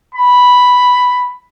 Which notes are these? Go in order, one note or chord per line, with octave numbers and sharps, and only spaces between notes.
B5